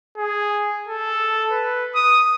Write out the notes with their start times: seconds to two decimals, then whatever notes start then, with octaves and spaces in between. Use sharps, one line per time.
0.17 G#4
0.88 A4
1.51 B4
1.95 D#6